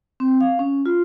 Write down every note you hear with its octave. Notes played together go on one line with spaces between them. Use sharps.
C4
F5
C#4
F4